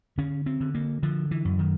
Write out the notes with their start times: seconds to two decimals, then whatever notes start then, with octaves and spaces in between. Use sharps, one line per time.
0.18 D3 C#4
0.46 C4
0.60 D3
0.75 A#3
1.03 D3 F3
1.31 E3
1.45 F#2
1.59 D#3